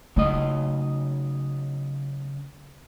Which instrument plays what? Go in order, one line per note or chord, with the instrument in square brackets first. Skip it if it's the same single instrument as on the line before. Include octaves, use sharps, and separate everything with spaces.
[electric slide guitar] C#3 F#3 D#5 [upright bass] A3 D#4